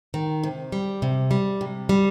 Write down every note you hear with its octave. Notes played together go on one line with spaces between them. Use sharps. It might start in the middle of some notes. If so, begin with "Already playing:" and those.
D#3
C3
G3
C3
G3
C3
G3